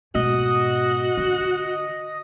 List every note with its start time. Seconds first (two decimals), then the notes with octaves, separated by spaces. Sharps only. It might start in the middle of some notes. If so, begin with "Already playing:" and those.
0.15 G#2 B2 F#4 D#5
1.17 D3